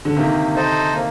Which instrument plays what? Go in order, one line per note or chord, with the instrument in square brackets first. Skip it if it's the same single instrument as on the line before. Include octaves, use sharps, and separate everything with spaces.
[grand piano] D3
[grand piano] C3 D#3 [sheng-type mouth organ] A#3
[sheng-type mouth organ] D#4 A4 C5 D#5
A#3